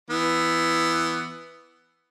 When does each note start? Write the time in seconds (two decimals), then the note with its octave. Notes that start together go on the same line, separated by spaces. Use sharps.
0.10 E3 B3